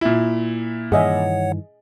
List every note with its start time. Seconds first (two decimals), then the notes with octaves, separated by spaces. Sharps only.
0.01 A#2 E4
0.92 G2 D#3 E3 G#4 C#5 D#5 E5 F#5